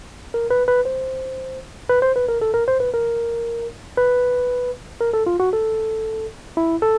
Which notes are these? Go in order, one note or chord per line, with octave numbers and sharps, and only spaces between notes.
A#4
B4
B4
C5
B4
C5
B4
A#4
A4
A#4
C5
B4
A#4
B4
A#4
A4
F4
F#4
A4
E4
A4